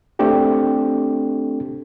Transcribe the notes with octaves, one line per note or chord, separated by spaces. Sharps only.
A3 C4 D4 G4 A4